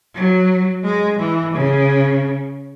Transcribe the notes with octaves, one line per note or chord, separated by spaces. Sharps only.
F#3
G#3
E3
C#3